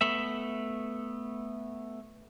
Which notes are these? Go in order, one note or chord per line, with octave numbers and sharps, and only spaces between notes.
A3 B3 E5